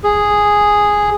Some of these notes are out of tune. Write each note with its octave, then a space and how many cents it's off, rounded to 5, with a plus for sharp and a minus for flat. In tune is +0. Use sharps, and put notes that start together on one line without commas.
G#4 -5